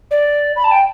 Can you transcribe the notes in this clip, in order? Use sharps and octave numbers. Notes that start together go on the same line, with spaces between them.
D5
B5
A5
G5